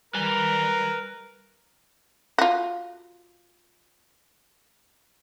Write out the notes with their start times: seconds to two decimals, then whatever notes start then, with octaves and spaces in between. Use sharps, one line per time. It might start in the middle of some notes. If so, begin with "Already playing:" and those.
0.14 G3 A#4 B4 G#5
2.38 F4 F#4